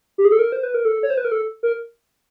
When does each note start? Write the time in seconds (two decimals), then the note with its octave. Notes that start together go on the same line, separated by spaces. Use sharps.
0.18 G4
0.25 G#4
0.32 A4
0.39 A#4
0.52 C5
0.63 B4
0.74 A#4
0.85 A4
1.03 C#5
1.10 C5
1.17 B4
1.25 A#4
1.32 A4
1.63 A#4